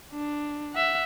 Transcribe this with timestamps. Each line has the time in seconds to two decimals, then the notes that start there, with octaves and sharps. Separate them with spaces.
0.13 D4
0.74 E5 F#5